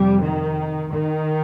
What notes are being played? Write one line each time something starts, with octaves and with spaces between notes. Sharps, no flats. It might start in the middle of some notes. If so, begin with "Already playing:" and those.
Already playing: F2 C3 G3
D#3
D#3